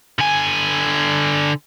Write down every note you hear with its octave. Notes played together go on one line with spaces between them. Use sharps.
D3 G#5